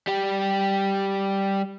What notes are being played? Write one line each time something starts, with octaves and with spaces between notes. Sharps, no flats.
G3 G4